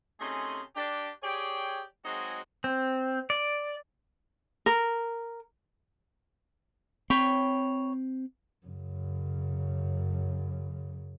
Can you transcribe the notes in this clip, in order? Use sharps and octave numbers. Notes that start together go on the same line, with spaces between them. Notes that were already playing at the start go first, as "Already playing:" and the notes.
C3 A3 C#4 D#4 G#4 C6
D4 G4
G4 G#4 C#5 D5 G5
F#3 G#3 C4 D#4 F#4 G#4
C4
D5
A#4
C4 C#5 G5 B5
F#2 C#3